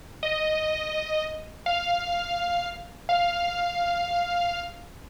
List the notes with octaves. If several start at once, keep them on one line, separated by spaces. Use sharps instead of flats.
D#5
F5
F5